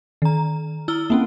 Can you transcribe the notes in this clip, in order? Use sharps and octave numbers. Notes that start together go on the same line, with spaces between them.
D#3 A#5
E4 E6 F6 G7
A#3 C4 C#4